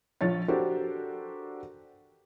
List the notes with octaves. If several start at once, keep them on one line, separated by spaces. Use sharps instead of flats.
A#1 F4 C#5 A6
D4 F#4 G4 A4 A#4 C5